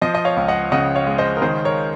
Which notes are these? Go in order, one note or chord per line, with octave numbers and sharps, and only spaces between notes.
F3 C5 D#5
D#5
C#5 F5
C#2
D#5 F#5
C#3 D#5 F#5
C#5 F5
G#3
C5 D#5
A#4
D#3 G#4 C5
A#4 C#5